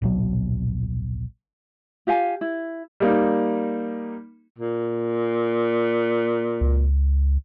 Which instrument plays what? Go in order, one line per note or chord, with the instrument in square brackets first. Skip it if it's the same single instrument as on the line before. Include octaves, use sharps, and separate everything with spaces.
[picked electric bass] D1 A#1 B2 F#3
[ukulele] F4 G4 F5 G#5
E4
[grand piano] G3 A#3 D#4
[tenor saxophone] A#2
[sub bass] C#2